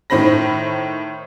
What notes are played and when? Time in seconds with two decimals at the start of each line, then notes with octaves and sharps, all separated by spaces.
0.10 A2 D#3 C5 B5 A#6